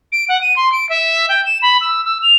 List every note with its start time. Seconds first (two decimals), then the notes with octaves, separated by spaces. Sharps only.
0.12 D7
0.28 F#5
0.41 D#7
0.56 C6
0.72 D7
0.89 E5
1.29 G5
1.45 E7
1.62 B5
1.81 E6
2.05 E6
2.22 F7